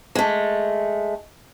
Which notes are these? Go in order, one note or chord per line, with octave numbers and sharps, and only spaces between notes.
G#3 A3